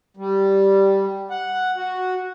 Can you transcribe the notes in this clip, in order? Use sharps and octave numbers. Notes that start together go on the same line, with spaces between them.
G3
F#5
F#4